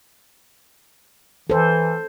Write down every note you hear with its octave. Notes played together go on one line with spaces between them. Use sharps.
E3 A4 C5